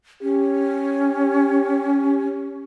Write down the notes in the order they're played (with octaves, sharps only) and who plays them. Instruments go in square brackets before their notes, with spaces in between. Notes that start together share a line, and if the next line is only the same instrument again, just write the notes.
[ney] C#4 [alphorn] G4